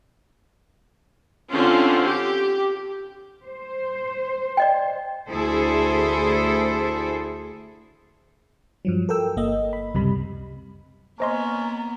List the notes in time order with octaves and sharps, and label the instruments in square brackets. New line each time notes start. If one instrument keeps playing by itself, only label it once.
[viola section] D3 C4 C#4 F4
G4
[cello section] C5
[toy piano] D5 D#5 G5
[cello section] D2 E4 G#4 A4 C5
[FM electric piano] G2 F3 F#3
A4 A#4 G5 E6
G1 A#3 D#5
B5
C#2 F#2 C3 G3 B5
[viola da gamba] A#3 B3 [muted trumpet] C#4 [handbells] C5 D#5 C6 [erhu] A#5